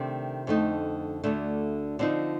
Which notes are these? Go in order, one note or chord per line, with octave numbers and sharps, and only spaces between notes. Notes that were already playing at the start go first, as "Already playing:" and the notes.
Already playing: C3 D#3 A3 D4
F2 D3 A3 D#4
D2 D3 A3 D4
D3 F3 C4 D#4